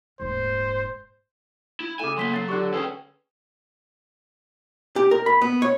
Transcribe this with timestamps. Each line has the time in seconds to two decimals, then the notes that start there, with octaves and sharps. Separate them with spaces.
0.20 D#1 G#2 C5
1.80 E4
1.99 C#3 A3 G#5 D6 E7
2.17 F#3 A#3 C6 B6 G7
2.34 F#3 A6 C7
2.49 D3 G4 D5 C#6 F#6
2.74 D2 C#4 G#4 A4 B4 G5
4.96 G4
5.11 A#4
5.26 B5
5.42 B3
5.62 C#5